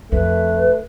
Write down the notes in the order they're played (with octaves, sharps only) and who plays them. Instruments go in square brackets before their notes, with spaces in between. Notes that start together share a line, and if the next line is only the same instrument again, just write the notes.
[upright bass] F2 [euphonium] A3 [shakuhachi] B4